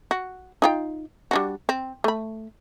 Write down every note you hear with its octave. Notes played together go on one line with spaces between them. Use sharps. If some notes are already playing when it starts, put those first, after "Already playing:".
F#4
D#4 F4 G5
G3 D4 F#4
C4
A3 B5